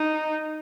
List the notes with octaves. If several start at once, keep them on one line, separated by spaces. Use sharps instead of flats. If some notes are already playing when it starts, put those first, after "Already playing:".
Already playing: D#4